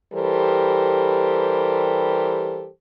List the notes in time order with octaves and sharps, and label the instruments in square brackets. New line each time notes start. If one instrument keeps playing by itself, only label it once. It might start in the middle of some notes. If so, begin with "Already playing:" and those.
[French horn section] E3 G3 G4 A4 A#4 C5